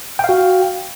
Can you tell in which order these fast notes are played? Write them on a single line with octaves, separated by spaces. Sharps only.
G5 F5 F#4